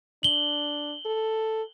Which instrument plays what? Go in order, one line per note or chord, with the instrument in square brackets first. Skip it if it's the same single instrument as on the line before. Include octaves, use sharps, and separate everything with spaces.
[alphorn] D4 [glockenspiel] F#7 G7
[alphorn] A4